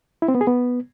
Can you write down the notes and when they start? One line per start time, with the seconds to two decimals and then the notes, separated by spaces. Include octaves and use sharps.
0.22 E4
0.28 C4
0.35 B3
0.41 G#4
0.47 B3